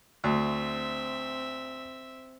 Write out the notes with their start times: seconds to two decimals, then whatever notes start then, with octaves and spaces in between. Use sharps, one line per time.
0.24 D2 C4 E5